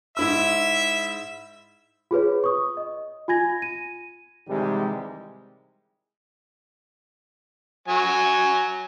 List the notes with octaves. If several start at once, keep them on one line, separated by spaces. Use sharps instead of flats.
G#2 E4 E5 E6
F4 G#4 B4 C#5
C#6 D#6
D#5
F4 G#5 G#6 A#6
D#7
G#2 C3 D#3 E3 G3 G#3
F#3 G#5